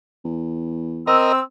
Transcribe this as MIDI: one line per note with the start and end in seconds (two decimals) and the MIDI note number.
0.25 1.18 40
1.07 1.40 60
1.07 1.32 70
1.07 1.32 75
1.07 1.40 88